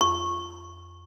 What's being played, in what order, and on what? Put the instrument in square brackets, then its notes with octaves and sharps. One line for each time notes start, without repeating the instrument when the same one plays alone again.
[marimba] F2 [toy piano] C#6